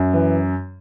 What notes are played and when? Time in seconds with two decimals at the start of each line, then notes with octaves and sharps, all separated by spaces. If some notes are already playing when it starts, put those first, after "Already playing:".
Already playing: F#2
0.13 E3